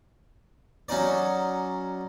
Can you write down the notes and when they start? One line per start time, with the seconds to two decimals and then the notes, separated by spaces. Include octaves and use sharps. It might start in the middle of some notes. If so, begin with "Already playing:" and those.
0.89 F#3 C#4 D#4 D5